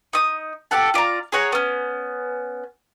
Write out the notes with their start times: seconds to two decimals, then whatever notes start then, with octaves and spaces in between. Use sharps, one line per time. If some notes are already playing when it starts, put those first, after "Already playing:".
0.13 D#4 D#6
0.71 G4 A4 F#5 A5
0.94 F4 D5 F5 A#5
1.32 G#4 C#5 F#5 A#5
1.52 B3 C#4